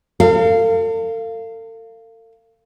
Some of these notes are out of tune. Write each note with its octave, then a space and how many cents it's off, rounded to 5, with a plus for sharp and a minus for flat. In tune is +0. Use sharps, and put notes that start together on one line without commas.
A4 +45 F5 -20